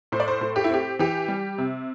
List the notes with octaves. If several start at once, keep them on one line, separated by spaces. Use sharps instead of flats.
A2 C5
D5
C5
A2
G4
E4
C4 G4
E3 G4
G3
C3